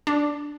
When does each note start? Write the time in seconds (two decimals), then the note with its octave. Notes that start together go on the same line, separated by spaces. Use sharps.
0.07 D4